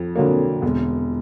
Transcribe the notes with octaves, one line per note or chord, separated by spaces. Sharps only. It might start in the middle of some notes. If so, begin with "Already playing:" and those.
Already playing: F2
D3 F#3 A#3
E1